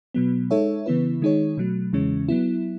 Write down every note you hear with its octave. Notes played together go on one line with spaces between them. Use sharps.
B2 F#3 B3
G#3 D#4 A4 C#5 E5
C#3 E3 B3 E4 B4
D#3 G#3 D#4 G#4 C#5
B2 F#3 A3
E2 C#3 E3 G#3 C#4
F#3 B3 E4